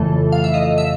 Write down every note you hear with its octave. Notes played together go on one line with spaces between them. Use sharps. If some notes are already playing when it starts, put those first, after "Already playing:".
Already playing: F2 C#3 E3 A3 A4
F5
E5
D#5
E5